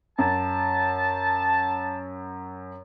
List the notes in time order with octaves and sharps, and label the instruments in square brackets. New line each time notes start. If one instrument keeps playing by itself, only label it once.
[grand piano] F#2 [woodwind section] A5